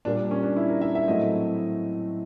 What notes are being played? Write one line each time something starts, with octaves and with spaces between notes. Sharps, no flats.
A#2 G3 A#3 D4
D4
C#4
D4
E4
A#4
E5
E5
A2 F#3 A3 C4 D#5